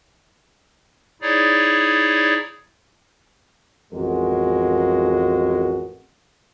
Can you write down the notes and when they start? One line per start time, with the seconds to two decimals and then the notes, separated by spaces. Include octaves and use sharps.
1.22 D#4 E4 G#4 C#5 D5
3.93 A1 F2 G#3 F#4 A#4